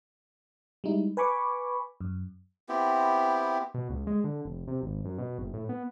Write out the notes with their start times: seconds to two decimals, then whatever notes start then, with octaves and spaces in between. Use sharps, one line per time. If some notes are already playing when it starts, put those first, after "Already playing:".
0.84 G3 G#3 D#4 E4
1.17 B4 G#5 B5 C#6 D6
2.01 F#2
2.69 B3 C4 E4 G4
3.74 B2
3.89 C#2
4.07 G#3
4.24 D3
4.45 F1
4.68 C3
4.82 G#1
5.05 F#2
5.18 B2
5.39 F#1
5.54 A2
5.69 B3